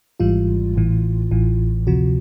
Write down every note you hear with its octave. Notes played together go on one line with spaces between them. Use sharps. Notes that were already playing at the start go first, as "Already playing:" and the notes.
G#1 G#2 E3 G3 F4
A1 A2 E3
A1 A2 E3
D2 C3 F3 F#4